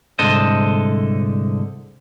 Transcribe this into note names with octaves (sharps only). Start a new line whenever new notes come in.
C2 G#2 D3 A4 C5 D#5